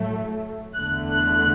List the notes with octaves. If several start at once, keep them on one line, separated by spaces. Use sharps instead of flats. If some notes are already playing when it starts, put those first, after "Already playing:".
Already playing: A2 F#3 A3
E2 D3 A3 F#6
F#6